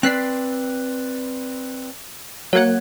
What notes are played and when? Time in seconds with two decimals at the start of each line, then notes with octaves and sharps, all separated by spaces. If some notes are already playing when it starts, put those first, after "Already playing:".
0.03 C4 B4 D5 F#6 B6 C7
2.53 F#3 A#3 C#5 F#5 G#6